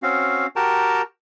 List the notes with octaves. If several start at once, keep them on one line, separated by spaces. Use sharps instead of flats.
C4 C#4 F#4 F5
F#4 G4 A#4 G5 A5 A#5